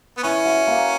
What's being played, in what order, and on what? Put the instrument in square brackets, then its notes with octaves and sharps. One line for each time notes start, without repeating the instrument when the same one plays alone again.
[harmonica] B3
[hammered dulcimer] E3 [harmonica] C#4
[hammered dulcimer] F#4
A#3